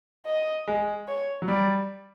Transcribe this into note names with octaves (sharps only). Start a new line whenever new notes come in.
D#5
G#3
C#5
F#3
G3 D5